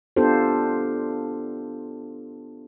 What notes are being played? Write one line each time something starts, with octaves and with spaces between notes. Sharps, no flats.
B3 D4 F4 G4 A4 C5